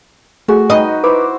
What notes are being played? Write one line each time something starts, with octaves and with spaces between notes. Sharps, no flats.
A3 F#4 G#4
D#4 B4 D#5
E4 B4 C5 D6